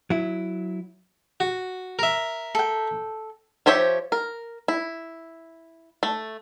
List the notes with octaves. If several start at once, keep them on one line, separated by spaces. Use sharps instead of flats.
F#3 E4
F#4
A#4 E5
A4 G5
F3 G4 C5 C#5 E5
A#4
E4
A3